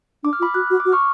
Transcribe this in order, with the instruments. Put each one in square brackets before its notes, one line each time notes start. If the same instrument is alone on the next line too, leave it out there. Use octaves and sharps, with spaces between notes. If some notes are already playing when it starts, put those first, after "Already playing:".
[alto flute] D4 [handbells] D6
[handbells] F6
[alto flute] F4 [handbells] B5 D6
[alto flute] F#4 [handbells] F#6
[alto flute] F#4 [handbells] F6
[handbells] D6
[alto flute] F#4
[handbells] C#6 F6